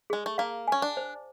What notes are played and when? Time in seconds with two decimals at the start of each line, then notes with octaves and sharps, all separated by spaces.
0.10 G#3 G#4
0.26 A3
0.38 A#3 F5
0.68 C#4 G#5
0.82 D4
0.97 C5